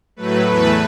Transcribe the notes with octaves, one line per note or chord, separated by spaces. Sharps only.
A2 F#3 A3 B4
E2 E3 A3 B4